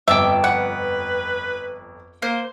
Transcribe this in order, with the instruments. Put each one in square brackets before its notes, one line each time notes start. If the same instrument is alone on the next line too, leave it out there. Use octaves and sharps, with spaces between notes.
[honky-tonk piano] G1 F2 [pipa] E5 [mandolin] G5 A5 D6
[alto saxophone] B4 [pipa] F#5
[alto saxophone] A#3 [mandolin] C5